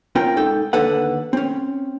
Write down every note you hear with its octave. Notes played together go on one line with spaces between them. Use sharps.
C4 C#4 F4 A#4 G5
G#2 D#4 A4 G5
D#2 D3 A4 B4 F#5
C4 C#4